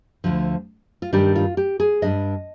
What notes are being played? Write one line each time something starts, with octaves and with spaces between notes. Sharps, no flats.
D2 D3 F3
F4
G2 D#3 G3 D4 G4
F4
G4
G#4
G2 D#3 G3 D4 D#5